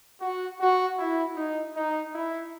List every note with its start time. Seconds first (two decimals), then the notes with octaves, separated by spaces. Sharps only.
0.21 F#4
0.60 F#4
0.98 E4
1.37 D#4
1.76 D#4
2.15 E4